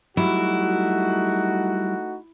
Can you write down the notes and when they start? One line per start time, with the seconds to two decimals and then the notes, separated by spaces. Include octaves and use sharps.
0.17 F#3 G3 A3 D#4 E4 F#4